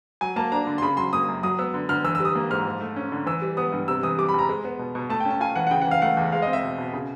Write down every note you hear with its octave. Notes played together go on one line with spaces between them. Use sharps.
F#3 G#5
A#3 A5
D4 A#5
D3
C6
C#3 B5
F#3 C6
A#3 D#6
F#2
F#3 D#6
B3 E6
D3
D3 F6
E3 E6
E6
G3
D#6
A#3
G#2 F6
F3
A3
C#4
D3
E3 E6
G3
B3 D#6
G2
C3 E6
E3 D#6
G3 D6
B5
E2 A#5
G#3
B3
B2
B2
A3 A5
G5
C#4
A5
F4 G#5
E3 F#5
F#5
C#3 G5
F#5
E3 F5
A3 F#5
E2
G#3 F5
D#5
C4
E5
B2
B2
C#3